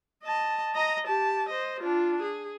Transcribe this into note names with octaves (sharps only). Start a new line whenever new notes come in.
D#5 A5
D#5 A#5
G4 A5
C5 D#5
D4 F4
G#4